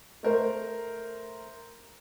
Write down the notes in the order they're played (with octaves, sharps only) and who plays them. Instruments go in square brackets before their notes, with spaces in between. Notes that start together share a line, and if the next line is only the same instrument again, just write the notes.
[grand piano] A3 A#4 C5